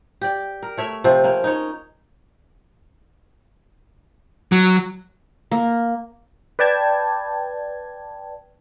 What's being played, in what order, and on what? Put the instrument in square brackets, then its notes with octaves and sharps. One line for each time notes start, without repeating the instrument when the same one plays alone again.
[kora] G4 D5
A#4
A3 C#5 E5
C3 F3
A#3 C#4
D#4 C#5
[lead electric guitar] F#3
[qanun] A#3
[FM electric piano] B4 D5 G5 A5 G#6